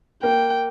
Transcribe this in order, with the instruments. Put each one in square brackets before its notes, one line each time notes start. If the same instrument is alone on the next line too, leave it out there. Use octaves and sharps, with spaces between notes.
[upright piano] A#3 [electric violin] G5